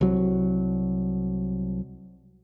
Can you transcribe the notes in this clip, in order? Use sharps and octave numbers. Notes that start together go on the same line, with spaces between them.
C2 F#3